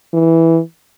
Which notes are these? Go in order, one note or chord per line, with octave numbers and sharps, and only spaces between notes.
E3